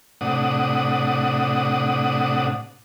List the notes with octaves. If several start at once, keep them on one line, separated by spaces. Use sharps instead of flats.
A2 C3 D4 F#5 D#6